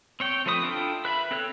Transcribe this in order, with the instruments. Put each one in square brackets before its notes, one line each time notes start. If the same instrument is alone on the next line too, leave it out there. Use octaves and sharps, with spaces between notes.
[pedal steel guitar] C4 C#5 G5
F3 A3 C4 B4 D#6
D4 E4 F4 A4 G5
B4 E5 B5
C4 A4 C#5 F#6